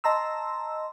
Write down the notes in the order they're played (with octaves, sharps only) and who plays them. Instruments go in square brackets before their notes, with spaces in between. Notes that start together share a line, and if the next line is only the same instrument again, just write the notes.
[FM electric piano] D#5 A5 A#5 C6 E6